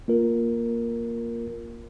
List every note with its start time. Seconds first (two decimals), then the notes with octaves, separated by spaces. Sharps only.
0.08 A#3 F4 A#4